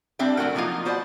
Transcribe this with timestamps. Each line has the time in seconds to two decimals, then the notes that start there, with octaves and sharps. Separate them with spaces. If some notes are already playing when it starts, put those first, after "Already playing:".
0.19 G3 C4 D4 E5 G5
0.37 F#3 A3 F#4 A4 A#4 G5
0.55 F3 F#3 A#3 D#4 F4
0.85 B3 F#4 C5 D5 E5 A5